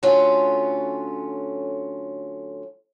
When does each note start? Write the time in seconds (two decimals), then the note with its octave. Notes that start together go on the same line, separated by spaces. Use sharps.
0.03 D3 F#3 A3 C#4 F4